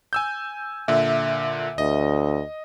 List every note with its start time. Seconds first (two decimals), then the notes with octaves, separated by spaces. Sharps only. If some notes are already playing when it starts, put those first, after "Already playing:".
0.13 G#5 E6 G6
0.88 A#2 D3 E5
1.78 D2 D#5